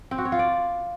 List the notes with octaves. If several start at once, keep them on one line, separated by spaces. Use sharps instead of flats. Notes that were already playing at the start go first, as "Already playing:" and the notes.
C4
F#4
C#5
F4
D5